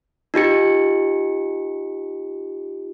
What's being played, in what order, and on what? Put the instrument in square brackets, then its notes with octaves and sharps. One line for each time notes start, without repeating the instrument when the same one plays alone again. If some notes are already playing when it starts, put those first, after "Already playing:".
[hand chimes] D#4 F4 G4 C#7